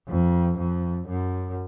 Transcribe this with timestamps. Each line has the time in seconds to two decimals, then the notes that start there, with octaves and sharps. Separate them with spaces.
0.09 F2
0.58 F2
1.08 F#2